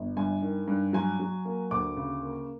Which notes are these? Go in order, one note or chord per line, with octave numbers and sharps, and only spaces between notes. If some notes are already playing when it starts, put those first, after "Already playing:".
Already playing: G1
G2 G#5
D#3
G2
F#3 G#5
F#3
A#3
D2 D6
C#3
A#3